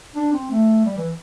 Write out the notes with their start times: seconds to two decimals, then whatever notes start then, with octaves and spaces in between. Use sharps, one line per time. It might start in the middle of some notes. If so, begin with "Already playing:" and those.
0.16 D4
0.33 C4
0.51 A3
0.85 G3
0.97 E3